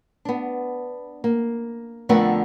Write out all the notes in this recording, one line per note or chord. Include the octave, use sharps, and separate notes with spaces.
B3 D4
A#3
F2 D3 A3 B3 A#4 F#5